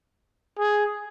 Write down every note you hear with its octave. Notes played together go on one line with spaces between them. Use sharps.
G#4